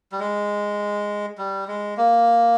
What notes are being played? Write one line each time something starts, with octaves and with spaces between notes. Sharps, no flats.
G3
G#3
G3
G#3
A#3